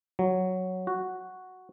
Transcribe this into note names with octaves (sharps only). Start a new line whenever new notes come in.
F#3
F#4